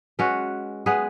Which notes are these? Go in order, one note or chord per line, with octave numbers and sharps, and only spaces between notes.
G#3 C#4 F#4 B4
G#3 B3 G#4 B4